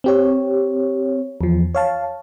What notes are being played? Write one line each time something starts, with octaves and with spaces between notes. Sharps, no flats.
C4 G4 C#5
E2 F3
C#5 F5 A5